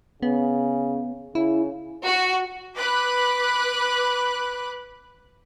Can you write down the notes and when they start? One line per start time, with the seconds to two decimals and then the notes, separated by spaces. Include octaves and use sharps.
0.23 C#3 B3
1.35 C#3 E4
2.04 F#4
2.76 B4 B5 D6 F#6